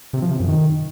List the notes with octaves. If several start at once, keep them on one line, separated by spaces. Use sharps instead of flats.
C3
F3
C3
F#2
D#3